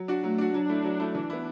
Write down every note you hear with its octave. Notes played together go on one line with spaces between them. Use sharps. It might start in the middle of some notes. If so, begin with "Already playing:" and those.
Already playing: F#3
D4 F#4
F#3 A3
D4 F#4
F#3 D4
A3 E4
F#3
A3 E4
E3 D4
B3 E4